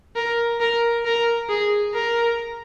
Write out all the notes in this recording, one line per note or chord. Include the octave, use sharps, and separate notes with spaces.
A#4
A#4
A#4
G#4
A#4